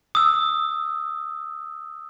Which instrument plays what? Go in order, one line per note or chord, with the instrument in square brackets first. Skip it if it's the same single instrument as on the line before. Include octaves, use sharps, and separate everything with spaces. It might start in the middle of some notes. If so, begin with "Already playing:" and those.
[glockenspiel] D#6 E6